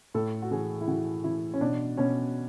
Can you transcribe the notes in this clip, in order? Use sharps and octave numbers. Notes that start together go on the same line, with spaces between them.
A2 A4
F#4
E3 G#4
E4
E3 F#4
E3 E4
C#4
B2 D4
B2 C#4